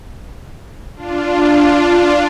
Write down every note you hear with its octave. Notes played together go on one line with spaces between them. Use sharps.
D4 F4